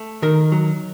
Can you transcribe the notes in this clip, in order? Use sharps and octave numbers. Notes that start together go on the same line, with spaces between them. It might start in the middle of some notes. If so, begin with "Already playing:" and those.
Already playing: A3
D#3 A#4
F#3